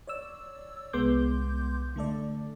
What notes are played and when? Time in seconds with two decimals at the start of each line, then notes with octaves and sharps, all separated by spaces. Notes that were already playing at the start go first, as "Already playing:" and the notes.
0.07 C#5 D5 E6
0.93 C2 G#3 B3 C6 D6 G6
1.96 D3 A3 A4 D5